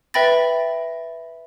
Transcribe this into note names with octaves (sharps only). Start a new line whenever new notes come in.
B4 E5 G5 B5 A6 A#6